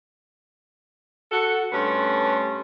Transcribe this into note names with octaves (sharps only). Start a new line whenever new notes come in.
F#4 A4 F#5
G2 A3 C#4 B4 A5 C6